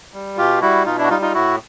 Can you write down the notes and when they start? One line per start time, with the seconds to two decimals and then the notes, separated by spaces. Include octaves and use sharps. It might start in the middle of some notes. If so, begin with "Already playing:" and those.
0.14 G3
0.37 B2 F4 G4
0.61 G3 E4 F#4
0.86 B2 D#4 F4
0.98 D4 E4
1.04 F#4
1.10 G3 D#4 F4
1.22 D#4 F4
1.34 A2 E4 F#4